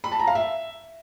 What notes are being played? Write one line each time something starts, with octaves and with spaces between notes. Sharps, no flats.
B5
A5
A#5
F5
E5